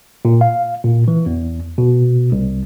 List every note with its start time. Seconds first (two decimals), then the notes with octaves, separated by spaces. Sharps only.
0.25 A#2
0.41 F5
0.84 A#2
1.08 E3
1.26 E2
1.78 B2
2.32 C2